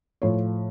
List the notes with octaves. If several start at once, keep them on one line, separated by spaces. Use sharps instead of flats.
A2 F3 C#5